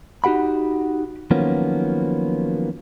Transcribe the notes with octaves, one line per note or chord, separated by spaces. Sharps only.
D#4 F#4 G4 F#5 B5
D#3 F3 F#3 A#3 B3 C#4